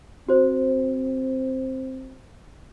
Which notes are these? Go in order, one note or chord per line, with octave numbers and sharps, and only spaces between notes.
C4 F#4 C5